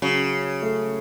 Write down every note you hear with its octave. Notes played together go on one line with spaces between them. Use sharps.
C#3 F#3
A3